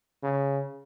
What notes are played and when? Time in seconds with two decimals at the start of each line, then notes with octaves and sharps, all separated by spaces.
0.23 C#3